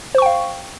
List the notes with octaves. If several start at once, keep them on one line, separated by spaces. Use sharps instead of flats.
C5 F5 G5 C#6